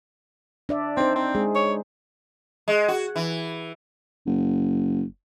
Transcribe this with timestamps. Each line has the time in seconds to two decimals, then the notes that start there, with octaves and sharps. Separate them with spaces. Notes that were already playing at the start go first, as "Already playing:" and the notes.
0.69 D4 D5 E5
0.97 C4 D#4 C5
1.16 C4
1.35 G#3 G#4
1.56 C#5
2.68 G#3
2.88 F#4
3.16 E3
4.26 F#1